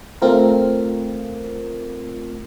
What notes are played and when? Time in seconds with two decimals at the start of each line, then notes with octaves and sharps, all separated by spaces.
0.22 A3 C4 F4 A#4